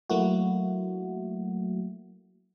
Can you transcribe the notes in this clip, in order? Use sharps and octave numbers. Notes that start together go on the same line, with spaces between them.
F#3 A3 A#3 E4 F#4